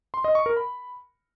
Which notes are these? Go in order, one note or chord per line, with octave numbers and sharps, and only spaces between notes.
C6
D#5
C#6
A#4
B5